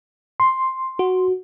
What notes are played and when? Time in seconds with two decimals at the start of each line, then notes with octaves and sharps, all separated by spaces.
0.40 C6
0.99 F#4